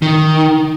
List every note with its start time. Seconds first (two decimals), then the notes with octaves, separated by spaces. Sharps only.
0.02 D#3